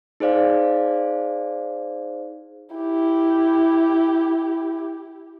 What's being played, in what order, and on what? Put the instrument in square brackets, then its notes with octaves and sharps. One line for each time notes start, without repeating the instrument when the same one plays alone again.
[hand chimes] D#4 G#4 C5 D5 F5
[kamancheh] E4 G4